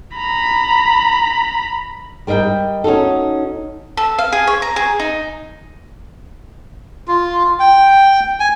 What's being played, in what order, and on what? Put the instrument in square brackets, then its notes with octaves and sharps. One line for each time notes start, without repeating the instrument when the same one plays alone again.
[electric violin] A#5 B5
[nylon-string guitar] G3 A#4 D#5 E5 G5
C#4 D#4 F#4 A4
[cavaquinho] A4
F5
G#4
C#5
A#5
G#4
D#4
[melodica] F4
G5
G#5